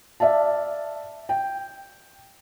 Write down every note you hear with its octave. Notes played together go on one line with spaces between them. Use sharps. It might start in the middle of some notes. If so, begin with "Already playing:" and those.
D5 E5 F5 A5
G5